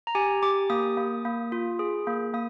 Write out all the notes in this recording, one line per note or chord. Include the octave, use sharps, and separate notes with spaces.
A#5
G4 G#5
G4 D6
A#3 D#6
A#3
A#3
F4
G#4
A#3
A#3 D#6